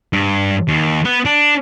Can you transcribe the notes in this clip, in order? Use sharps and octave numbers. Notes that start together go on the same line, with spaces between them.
G2
D#2
B3
D4